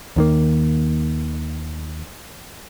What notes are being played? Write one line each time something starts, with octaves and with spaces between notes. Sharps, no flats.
D#2 D#3 A#3